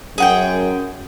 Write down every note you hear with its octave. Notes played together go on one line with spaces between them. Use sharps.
F#2 G#4 F#5 G5